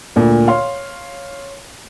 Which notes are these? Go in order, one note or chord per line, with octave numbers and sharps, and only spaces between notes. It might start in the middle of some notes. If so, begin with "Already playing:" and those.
D2 A#2
C#5 F5 C6